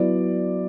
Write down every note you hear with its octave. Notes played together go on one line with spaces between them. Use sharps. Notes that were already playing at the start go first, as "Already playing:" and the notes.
Already playing: F#3 B3 E4 D5